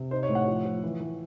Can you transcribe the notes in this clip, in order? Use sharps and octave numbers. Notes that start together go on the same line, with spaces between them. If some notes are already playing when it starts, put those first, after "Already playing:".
Already playing: C3
D#4 C5
C#5
A2
F#5
F3
F3
E3
E3